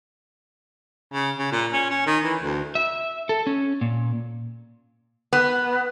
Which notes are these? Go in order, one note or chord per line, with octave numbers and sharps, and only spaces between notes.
C#3
C#3
A#2
C#4
C#4
D#3
E3
D2
E5
A4
C#4
A#2
B3